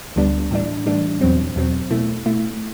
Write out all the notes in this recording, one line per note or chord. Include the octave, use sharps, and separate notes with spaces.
D2 D3 G3 B3 D4
A2 E3 G3 D4
A2 E3 G3 D4
E2 B2 F#3 C4
E2 B2 F#3 C4
B2 A3 E4
B2 A3 E4